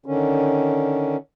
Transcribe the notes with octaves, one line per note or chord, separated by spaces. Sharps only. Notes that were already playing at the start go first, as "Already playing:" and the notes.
D3 D#3 C#4